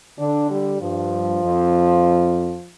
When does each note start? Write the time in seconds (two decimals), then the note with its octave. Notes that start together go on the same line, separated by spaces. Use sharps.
0.19 D3 D4
0.50 G3
0.81 G2 F3
1.44 F2